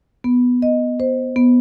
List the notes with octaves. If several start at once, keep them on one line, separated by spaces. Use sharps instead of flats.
B3
D#5
C5
B3